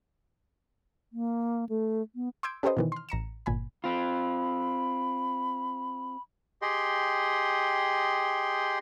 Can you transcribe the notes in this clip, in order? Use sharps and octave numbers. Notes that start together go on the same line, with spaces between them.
A#3
A3
B3
C6 D6 E6 G6 G#6 D7
C#4 G4 A4 B4 C5 D#5
B2 D#3 E3
C6 F6
A1 A#5 C#7 E7
G1 A#2 G#5 B5
C4 F4 B5
G4 G#4 D#5 G5 C6